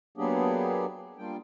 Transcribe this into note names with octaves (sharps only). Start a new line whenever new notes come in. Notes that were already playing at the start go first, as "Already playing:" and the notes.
F#3 A#3 B3 D4 G4 G#4
G3 A#3 D4 F4 G5